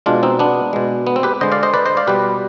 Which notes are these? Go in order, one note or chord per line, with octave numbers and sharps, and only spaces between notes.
B2 G#3 D4 F4
C4 D#4
B3 D4
B2 G#3
B3
C4
G4 B4
D3 G#3 C5 D#5
D5 F5
C5 D#5
B4 D5
C5 D#5
D5 F5
B2 G3 G4 B4